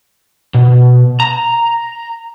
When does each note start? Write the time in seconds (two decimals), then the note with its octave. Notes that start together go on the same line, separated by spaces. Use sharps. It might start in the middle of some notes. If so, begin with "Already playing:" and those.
0.54 B2
1.20 A#5